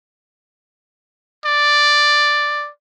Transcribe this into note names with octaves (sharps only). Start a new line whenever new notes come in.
D5